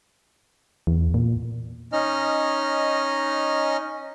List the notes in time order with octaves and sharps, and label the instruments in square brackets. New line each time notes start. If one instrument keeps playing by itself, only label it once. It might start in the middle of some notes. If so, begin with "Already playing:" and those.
[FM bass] E2
A#2
[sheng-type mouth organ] C#4 D#4 D#5 F6